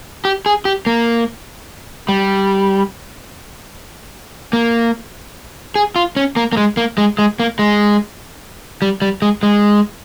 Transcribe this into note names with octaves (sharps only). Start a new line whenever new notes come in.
G4
G#4
G4
A#3
G3
A#3
G#4
F4
C#4
A#3
A#3
G#3
A#3
G#3
G#3
A#3
G#3
G3
G3
G#3
G#3